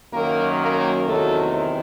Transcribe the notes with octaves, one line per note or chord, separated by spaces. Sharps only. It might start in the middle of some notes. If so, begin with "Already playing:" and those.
F#2 D#3 F#3 A#3 A#4
A#3 A#4
E2 C3 D#3 F#3 A3 A4